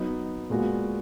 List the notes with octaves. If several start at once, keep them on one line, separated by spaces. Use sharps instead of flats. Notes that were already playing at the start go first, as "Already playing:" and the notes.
Already playing: F#3 B3 D#4
A#2 G#3 B3 F#4